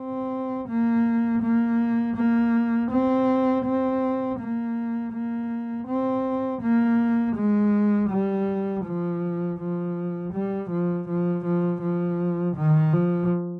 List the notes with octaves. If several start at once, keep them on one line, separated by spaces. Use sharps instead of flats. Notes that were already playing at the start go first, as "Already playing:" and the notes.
Already playing: C4
A#3
A#3
A#3
C4
C4
A#3
A#3
C4
A#3
G#3
G3
F3
F3
G3
F3
F3
F3
F3
D#3
F3